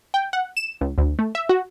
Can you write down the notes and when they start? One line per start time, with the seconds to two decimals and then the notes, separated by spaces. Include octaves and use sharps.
0.14 G5
0.33 F#5
0.57 E7
0.81 C#2
0.98 D2
1.19 A3
1.35 E5
1.49 F#4